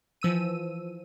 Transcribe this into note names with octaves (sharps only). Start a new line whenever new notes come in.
E3 F3 E6 D#7